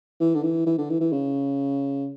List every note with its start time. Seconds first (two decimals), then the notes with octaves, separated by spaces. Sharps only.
0.20 E3
0.35 D3
0.43 E3
0.66 E3
0.78 D3
0.89 E3
1.00 E3
1.12 C#3